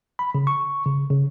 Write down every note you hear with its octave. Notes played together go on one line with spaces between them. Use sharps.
B5
C#3
C#6
C#3
C#3